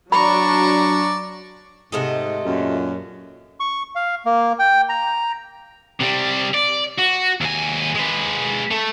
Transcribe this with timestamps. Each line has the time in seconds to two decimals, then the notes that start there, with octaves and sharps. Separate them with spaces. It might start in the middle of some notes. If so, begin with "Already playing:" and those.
0.12 F#3 D4 D5 A#5 B5 C#6
1.92 G#2 C3 A3 D#5
2.45 F#2 A#2
3.60 C#6
3.95 F5
4.26 A#3
4.59 G5
4.89 A#5
6.01 C3 G3
6.55 D5
6.99 F#4
7.41 D#2 G#5
7.95 G#3 B4
8.71 A3